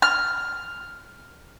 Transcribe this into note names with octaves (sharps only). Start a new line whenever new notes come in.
F6